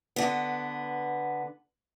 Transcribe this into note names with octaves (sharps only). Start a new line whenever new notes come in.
D3 B3